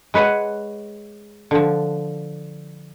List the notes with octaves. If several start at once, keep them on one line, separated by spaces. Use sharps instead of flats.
G#3 B4 C#5 F#5 G#5
D3 F3